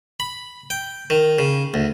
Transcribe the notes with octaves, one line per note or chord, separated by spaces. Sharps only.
B5
G5
D#3
C#3
D2